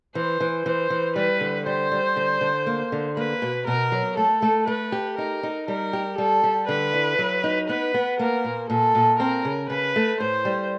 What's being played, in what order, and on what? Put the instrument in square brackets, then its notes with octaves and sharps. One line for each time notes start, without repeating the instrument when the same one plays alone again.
[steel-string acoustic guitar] E3 [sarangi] C5
[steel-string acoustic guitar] E3
[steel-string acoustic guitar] E3 [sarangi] C5
[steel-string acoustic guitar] E3
[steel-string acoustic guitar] G3 [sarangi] B4
[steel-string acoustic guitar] D3
[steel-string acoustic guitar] G3 [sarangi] C5
[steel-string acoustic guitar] G3
D3
D3
A#3
D3
[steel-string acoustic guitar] A#3 [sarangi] B4
[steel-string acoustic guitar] B2
[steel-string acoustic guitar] B2 [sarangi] A#4
[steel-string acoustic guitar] F#3
[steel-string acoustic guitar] A3 [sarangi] A4
[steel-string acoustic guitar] A3
[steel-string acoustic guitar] A3 [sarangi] B4
[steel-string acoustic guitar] G4
[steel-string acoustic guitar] D#4 [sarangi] A#4
[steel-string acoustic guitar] D#4
[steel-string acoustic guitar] G3 [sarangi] A#4
[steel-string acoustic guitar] G4
[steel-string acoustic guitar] G3 [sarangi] A4
[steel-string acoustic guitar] G3
[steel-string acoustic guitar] D3 [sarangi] B4
[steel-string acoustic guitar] E4
F#3
D#4
[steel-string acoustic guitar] B3 [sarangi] B4
[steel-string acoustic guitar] B3
[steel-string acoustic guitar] A#3 [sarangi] A#4
[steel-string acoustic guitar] A#2
[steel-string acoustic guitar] A#2 [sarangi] A4
[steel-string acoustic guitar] A#2
[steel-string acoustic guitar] C4 [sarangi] A#4
[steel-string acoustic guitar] C#3
[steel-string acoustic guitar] C#3 [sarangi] B4
[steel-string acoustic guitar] A3
[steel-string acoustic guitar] A2 [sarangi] C5
[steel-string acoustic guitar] G3